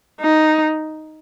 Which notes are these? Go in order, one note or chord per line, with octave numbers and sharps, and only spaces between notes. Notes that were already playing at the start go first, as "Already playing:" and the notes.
D#4